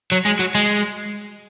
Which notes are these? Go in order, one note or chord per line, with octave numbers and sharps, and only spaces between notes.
F#3
G#3
F#3
G#3